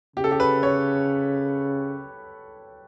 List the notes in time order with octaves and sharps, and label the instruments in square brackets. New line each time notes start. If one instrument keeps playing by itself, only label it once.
[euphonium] C#3 [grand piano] G4
[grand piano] A4
G4
B4
C#5